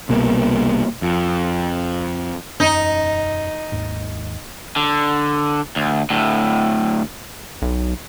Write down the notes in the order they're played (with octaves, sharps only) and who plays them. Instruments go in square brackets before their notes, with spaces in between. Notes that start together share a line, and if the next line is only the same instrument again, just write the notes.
[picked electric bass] C2 B2 A#3
F2
[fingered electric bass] E1 F#2 C#4 [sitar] D#4
[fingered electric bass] G#1 D#2 G#2
[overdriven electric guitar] D3
D2
D2 A2
[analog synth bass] B1